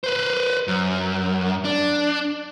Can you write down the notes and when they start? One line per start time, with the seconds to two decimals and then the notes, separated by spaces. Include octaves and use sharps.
0.04 B4 C5
0.68 F#2
1.65 D4